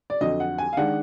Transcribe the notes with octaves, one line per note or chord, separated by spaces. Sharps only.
D5
F2 D3 F#3 D#5
F#5
G#5
F5
D#3 G#3 D4 F#5